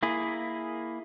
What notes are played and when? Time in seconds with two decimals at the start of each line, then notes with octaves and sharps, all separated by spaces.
0.03 A#3 E4 G#4